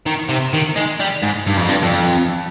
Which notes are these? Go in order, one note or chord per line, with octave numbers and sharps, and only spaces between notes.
D#3
C3
D#3
G#3
G3
G#2
G2
F2
G2
F2